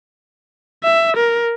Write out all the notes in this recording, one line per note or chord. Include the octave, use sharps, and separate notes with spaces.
E5
A#4